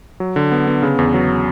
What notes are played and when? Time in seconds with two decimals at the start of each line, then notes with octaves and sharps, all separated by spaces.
0.20 F#3
0.36 D3
0.52 B3
0.67 B3
0.83 C#3
0.98 E2
1.14 F#3